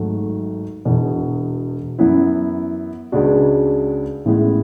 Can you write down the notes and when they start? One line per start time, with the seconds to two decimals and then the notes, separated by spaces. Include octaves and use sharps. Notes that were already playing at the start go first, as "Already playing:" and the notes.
Already playing: G#1 G#2 F#3 A3
0.85 E1 E2 B2
1.99 F#2 E3 B3 E4
3.12 C#2 C#3 G#3 D4 F#4
4.25 A1 A2 G#3 B3 E4